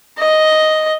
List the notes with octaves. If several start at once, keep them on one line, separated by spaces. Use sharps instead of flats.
D#5